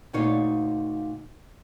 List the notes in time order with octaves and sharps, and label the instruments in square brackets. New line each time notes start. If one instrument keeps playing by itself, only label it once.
[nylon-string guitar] D2 A#2 D#4 C#5 F5